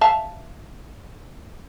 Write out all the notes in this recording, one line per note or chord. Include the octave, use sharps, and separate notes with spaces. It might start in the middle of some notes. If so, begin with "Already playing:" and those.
E5 F5 A5